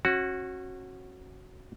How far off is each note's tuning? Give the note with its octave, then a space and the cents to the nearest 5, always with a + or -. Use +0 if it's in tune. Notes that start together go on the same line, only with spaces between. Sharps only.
C#4 -30 F#4 +0